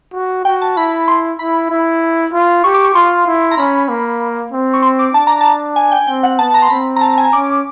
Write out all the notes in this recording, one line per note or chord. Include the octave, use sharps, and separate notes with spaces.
F#4
F#4 G5
A5
E4 B5
C6
E4 B5
E4
F4
G4 C#6
D6
C#6
F4 C6
E4
A#5
C#4 B5
A#3
C4
C#6
C6
D6
D4 A5
A#5
A5
G#5
G5
C4 G5
F#5
B3 A5
A#5
C6
C4 B5
A#5
A5
G#5
C#4 D6